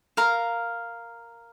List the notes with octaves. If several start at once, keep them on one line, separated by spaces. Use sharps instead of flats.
A#4 F5 A#5